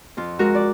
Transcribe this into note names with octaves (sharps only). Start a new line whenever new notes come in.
F2 F4
G#3 F#4 A#4
D5